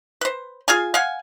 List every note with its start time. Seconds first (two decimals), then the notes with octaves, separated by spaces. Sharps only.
0.21 B4 C5
0.68 F4 G#4 F5 G#5
0.94 F5 F#5 G#5